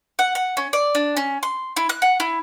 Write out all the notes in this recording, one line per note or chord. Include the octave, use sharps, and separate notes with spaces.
F#5
F#5
C#4
D5
D4
C#4
C6
E4
F#6
F#5
E4